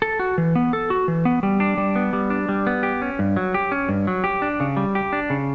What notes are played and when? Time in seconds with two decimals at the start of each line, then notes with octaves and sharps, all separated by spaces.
0.02 A4
0.20 F#4
0.38 E3
0.55 B3
0.73 A4
0.90 F#4
1.08 E3
1.25 B3
1.43 G3
1.60 D4
1.77 G3
1.96 B3
2.13 G3
2.30 D4
2.49 G3
2.67 B3
2.83 G4
3.02 C#4
3.19 G2
3.37 F#3
3.54 G4
3.72 C#4
3.89 G2
4.07 F#3
4.24 G4
4.42 D4
4.60 C#3
4.77 G3
4.95 G4
5.13 D4
5.30 C#3